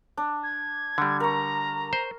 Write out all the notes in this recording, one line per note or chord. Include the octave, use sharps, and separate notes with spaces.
D4
G#6
D3 G3
A#4 A#5 C#6
C5